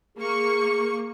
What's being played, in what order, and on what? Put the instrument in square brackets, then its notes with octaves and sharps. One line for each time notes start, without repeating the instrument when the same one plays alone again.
[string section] A#3 C#6 [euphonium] G#4